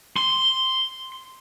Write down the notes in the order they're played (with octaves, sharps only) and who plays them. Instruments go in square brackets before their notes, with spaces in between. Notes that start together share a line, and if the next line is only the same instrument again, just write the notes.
[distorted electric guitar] C6